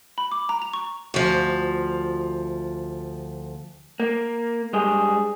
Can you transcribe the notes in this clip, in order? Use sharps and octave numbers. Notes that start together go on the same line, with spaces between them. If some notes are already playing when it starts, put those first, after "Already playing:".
B5
D6
A#5
F7
C#6
D2 F3
A#3
G2 G3 G#3 G#4